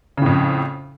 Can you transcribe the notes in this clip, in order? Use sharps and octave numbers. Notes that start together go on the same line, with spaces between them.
F2 A2 C#3